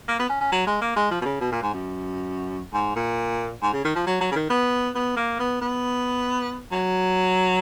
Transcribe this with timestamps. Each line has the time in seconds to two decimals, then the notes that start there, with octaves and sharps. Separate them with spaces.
0.08 A#3
0.19 B3
0.30 C#4
0.41 C#4
0.52 F#3
0.67 G#3
0.81 A#3
0.96 G#3
1.11 F3
1.21 B2
1.25 C#3
1.41 B2
1.52 A#2
1.63 G#2
1.74 F#2
2.73 G#2
2.96 A#2
3.62 G#2
3.73 C#3
3.84 D#3
3.96 F3
4.07 F#3
4.21 F#3
4.31 C#3
4.36 D#3
4.50 B3
4.95 B3
5.16 A#3
5.39 B3
5.61 B3
6.72 F#3